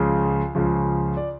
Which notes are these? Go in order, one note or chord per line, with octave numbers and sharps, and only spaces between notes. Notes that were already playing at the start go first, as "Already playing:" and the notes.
Already playing: C#2 C#3 F3
C#2 C#3 F3
D5